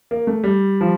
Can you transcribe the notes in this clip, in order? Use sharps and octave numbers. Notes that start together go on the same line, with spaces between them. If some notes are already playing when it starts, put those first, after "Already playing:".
A#3
A3
G3
F3